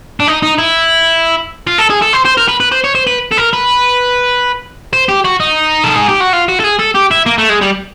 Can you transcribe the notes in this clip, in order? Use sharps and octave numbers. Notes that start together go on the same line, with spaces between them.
D4
D#4
D#4
E4
F4
A4
G#4
A4
C5
C5
A#4
B4
B4
C5
C#5
C5
B4
A4
A#4
B4
C5
G4
F#4
D#4
A4
G#4
G4
F#4
F4
F#4
A4
G#4
A4
G4
E4
A#3
A3
G#3
G3